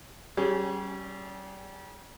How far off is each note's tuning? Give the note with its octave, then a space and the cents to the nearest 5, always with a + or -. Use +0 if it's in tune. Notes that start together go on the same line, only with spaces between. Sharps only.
G3 -30 C#4 +0 G#4 -15